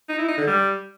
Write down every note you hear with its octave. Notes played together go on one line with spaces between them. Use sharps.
D#4
E4
D#4
D3
G3